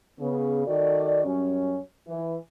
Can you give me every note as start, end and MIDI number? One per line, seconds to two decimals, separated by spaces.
0.20 0.66 49
0.20 0.66 59
0.67 1.22 51
0.67 1.22 66
0.67 1.22 69
0.67 1.22 74
1.25 1.77 42
1.25 1.77 54
1.25 1.77 55
1.25 1.77 61
2.08 2.35 52